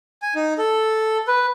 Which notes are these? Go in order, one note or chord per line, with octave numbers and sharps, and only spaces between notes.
G#5
D#4
A4
B4